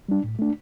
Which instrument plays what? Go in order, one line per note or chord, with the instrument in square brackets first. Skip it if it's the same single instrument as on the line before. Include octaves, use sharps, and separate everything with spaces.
[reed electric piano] G3 D4
A2
A3 D4